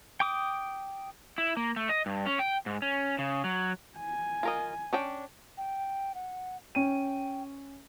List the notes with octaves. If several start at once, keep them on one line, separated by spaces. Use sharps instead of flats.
G5 D6 D#6
E4
A#3
A3
D#5
G2
C#4
G5
G#2
C#4
C#3
F#3
G#5
F4 A#4 D#5
C#4 D4 G5
G5
F#5
C#4 G5 D#7